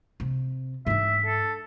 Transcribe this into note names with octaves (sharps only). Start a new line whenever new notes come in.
C3
G#2 D4 E5
A4